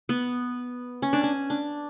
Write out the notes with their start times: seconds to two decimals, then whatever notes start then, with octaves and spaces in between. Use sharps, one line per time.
0.09 B3
1.02 C#4
1.13 D4
1.23 C#4
1.50 D4